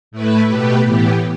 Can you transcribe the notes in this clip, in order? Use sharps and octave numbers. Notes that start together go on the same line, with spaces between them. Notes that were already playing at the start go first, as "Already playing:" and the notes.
A2 A3 E4 B4
B2 A3 G4 B4
A2 E3 B3 G4